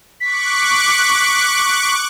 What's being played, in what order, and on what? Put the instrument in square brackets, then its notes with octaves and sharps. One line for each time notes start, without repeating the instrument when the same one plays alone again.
[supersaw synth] C#6 D6 F#6 [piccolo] B6